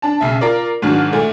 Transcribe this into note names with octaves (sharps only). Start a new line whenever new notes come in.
D4 A5
B1 C#3 E5
F4 A#4 D5
G#2 D#3 F#3 D4 F6
A#2 A3